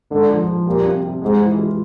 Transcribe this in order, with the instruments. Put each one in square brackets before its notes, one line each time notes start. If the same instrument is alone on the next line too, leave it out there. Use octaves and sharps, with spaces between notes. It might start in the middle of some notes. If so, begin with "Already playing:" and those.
[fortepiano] G#2 [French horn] D3
[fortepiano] F3
F3
[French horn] A#2 [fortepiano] G3
[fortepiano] C3
C3
[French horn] G#2 [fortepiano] G#3
[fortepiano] E3
F4